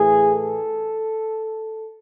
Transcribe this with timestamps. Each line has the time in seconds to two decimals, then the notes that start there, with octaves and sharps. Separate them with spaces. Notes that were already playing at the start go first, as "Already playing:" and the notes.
Already playing: A2 E3 G#4
0.29 A4